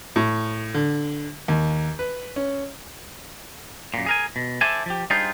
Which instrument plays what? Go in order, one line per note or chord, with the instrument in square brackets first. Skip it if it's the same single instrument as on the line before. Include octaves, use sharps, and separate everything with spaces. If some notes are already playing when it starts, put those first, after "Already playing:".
[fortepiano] A2
D3
D#2
B4
C#4
[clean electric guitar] F#2 A#2
G#4 A#4 G#5
B2
A4 C5 D5 E5 G#5
F3 G4
G3 D4 D#4 F4 G#4 C5